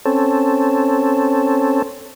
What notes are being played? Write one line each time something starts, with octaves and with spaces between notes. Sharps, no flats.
C4 C#4 A4